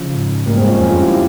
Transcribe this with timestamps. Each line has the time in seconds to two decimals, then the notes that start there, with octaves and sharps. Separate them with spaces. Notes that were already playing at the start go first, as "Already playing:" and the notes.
Already playing: C#3 F3
0.13 G#2
0.46 G#2 G3 A#3
0.57 G#3 C4
0.67 C#4 F4
0.79 F2
0.90 F4 G#4
1.01 E4 G4
1.12 E4 G4